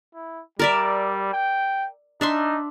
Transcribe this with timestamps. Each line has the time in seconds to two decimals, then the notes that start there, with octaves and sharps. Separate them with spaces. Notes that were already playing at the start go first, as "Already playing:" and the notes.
0.15 E4
0.59 G3 A#4 D5 E5
1.34 G5
2.21 D4 D#4 E5 C6